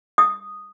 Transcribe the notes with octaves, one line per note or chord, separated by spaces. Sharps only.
D#6